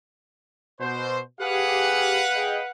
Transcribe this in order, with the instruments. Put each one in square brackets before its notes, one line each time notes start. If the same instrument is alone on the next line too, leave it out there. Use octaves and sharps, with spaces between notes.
[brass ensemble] B2 C5
[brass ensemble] G4 G#4 [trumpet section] B4 F5 F#5
[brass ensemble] G#4 D#5 G5